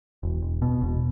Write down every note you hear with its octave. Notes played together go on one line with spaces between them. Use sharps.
E1
E1
B2
E1